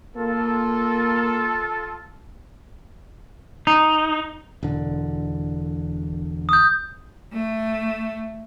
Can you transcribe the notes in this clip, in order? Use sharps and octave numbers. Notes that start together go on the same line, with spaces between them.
A#3 F4 A4
D#4
E1 D3
D#6 G6
A3